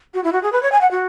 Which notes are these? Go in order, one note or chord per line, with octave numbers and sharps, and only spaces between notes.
F#4
E4
F#4
G#4
B4
C#5
G#5
F#5
F#4